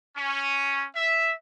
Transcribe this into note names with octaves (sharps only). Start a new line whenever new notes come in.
C#4
E5